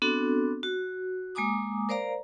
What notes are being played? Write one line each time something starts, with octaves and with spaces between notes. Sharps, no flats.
B3 C4 D4 F#4 A4
F#4
G#3 A#3 G#5 A#5 D6 D#6
A#4 C5 D5 F5 A#5